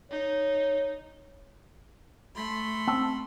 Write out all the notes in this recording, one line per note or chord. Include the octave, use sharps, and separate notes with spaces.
D#4 C#5
A3 B5 C6
C4 A5 E6